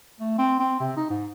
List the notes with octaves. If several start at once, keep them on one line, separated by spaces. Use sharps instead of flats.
A3
C4
C4
C3
D#4
G#2